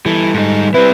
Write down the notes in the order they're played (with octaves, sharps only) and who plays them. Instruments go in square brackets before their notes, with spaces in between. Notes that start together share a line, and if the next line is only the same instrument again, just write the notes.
[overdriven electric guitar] E3 [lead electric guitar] G3 A4
[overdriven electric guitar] G#2 D#4
[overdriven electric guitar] G3 E4 [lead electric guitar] C4 [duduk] B4